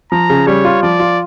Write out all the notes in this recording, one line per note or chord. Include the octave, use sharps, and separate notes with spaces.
F3 A#5
C#3
G3 C#5
F4
F3 D5
F4